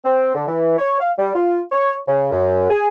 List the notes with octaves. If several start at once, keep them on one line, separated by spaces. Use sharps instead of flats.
C4
D3
E3
C#5
F5
G3
F4
C#5
C#3
F#2
G#4